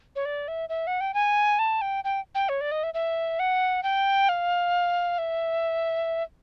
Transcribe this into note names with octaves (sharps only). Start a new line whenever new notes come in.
C#5
D5
E5
E5
F#5
G5
G#5
A5
G5
G5
G5
C#5
D5
D#5
E5
E5
F#5
G5
F5
E5